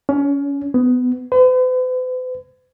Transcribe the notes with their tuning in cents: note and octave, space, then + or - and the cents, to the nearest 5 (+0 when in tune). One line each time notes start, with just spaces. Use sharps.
C#4 +25
B3 +20
B4 +45